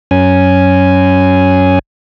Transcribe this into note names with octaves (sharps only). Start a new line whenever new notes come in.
F#2 C#4 G#5